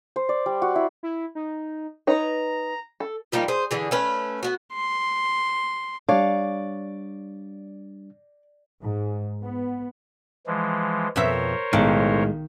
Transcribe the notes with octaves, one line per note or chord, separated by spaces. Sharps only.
C5
D5
G3
F#4
E4
E4
D#4
D#4 B4 C#5 A#5
A4
F3 G3 A#3 D#4
G#4 C5
D3 E3 G#4
A3 C#4 B4
B3 F#4
C6
G3 D4 C#5 D5 F5
G#2
B3
E3 F3 G#3
F2 B2 A#4 C5 C#5 E5
B1 A2 D#3 G#3